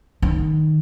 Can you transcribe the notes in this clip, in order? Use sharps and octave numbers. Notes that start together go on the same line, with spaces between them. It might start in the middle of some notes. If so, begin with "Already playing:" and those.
D#3